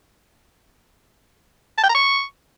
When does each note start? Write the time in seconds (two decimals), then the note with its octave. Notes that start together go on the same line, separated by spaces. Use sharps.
1.77 A5
1.83 G5
1.89 A#5
1.95 C#6